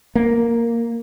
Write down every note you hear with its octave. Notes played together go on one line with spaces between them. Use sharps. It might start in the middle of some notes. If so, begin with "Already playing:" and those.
A#3